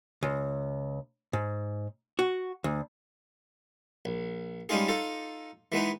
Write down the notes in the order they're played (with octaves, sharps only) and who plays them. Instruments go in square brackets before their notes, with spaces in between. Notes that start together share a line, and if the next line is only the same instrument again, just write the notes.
[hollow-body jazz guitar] C#2
G#2
F#4
D2
[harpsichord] A#1
G3 G#3 C#4 D#4 F4 G#4
D#4 F4 A4
E3 G#3 B3 D#4